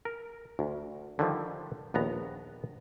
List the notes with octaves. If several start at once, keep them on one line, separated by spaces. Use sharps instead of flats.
A#4
D2
D3 D#3 F3 G3
A#1 D#2 B3 A#5